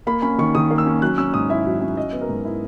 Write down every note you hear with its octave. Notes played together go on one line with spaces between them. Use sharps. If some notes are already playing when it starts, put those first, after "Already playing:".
A#3 B5
C#4 B5
D#3 C#6
D#3 D#6
A#3
E6
C#4
F#3 F#6
C#4 E6
G#2 D#6
E4 E5
F#3
C#4
F#3 D#5
B3
A#4
G#2
E4